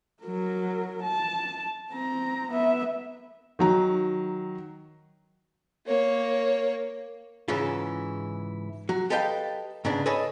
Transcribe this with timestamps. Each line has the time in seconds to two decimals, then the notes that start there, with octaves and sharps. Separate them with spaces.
0.23 F#3 A#4
1.03 A5
1.91 C4 A#5
2.51 B3 E5
3.59 D#3 F#3 A#5
5.87 A#3 C#5
7.48 G#2 C#3 E3 C#4 E4 F4
8.89 F#3 F#4
9.10 G4 A4 B4 D#5 F5 G5
9.85 G#2 C#3 B3 D4
10.06 G#4 A4 B4 C#5 D#5 G#5